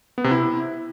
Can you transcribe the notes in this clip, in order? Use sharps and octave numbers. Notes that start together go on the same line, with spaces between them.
B3
C3
E4